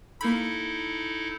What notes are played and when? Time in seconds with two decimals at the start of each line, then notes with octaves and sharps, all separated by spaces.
0.21 A#3 D#4 E4 A4 B5